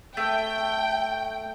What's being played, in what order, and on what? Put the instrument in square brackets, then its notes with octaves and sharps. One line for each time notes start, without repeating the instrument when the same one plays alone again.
[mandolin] A3 [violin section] G5